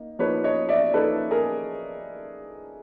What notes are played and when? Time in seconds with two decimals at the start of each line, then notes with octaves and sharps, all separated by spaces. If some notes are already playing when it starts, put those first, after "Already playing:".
Already playing: A#3 D#4
0.19 F3 A#3 D#4 B4 C#5
0.44 C#5 D#5
0.69 D5 E5
0.94 F3 A#3 D#4 A4 B4
1.31 G#4 A#4